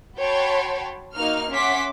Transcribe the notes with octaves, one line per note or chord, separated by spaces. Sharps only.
F#4 C#5 G5 A5 B5 C6
A#3 D#4 F#4 F6
C#4 E5 F#5 C6 D6 B6